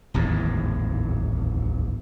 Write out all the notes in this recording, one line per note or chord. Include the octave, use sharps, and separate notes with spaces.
D1 G#1 E2 G#2